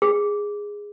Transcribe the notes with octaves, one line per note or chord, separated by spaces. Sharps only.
G#4